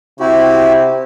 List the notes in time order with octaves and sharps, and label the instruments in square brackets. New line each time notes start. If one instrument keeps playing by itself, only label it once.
[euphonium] C3 [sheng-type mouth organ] E4 F#4 G4